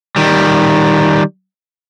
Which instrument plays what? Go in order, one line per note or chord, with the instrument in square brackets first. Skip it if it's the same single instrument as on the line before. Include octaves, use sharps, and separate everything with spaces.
[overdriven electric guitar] D#3 G3